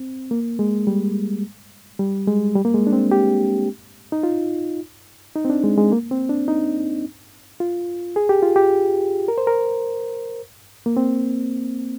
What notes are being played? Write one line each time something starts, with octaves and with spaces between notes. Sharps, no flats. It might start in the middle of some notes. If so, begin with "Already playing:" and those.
Already playing: C4
A#3
G#3
G3
G3
G#3
G3
A#3
G#3
D4
C4
G4
D#4
F4
D#4
C4
D4
G#3
G#3
A#3
C4
D4
D#4
F4
G#4
G4
F4
G4
A#4
C5
A#4
A#3
C4